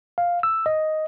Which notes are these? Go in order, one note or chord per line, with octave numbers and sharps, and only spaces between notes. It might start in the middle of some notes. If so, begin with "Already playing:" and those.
F5
E6
D#5